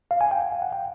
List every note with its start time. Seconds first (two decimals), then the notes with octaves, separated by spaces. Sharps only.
0.11 F5
0.21 G#5
0.31 G5
0.42 F#5
0.52 F5
0.62 F#5
0.72 G5